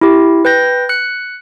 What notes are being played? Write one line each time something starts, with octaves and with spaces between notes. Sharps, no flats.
E4 G4
B4 G5 G6 A#6
F#6 C#7